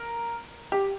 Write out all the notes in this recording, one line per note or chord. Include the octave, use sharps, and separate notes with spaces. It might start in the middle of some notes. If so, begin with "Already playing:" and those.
Already playing: A#4
G4